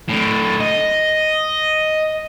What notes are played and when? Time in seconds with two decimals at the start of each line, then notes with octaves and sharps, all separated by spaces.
0.09 A2 D3
0.60 D#5